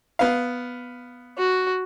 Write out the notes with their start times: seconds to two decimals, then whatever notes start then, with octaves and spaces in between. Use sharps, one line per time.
0.19 B3 F5
1.38 F#4